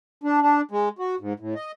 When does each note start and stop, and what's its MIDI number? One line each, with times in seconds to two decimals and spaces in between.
0.24 0.41 62
0.41 0.61 62
0.71 0.89 56
0.99 1.15 66
1.20 1.33 44
1.40 1.54 45
1.55 1.72 75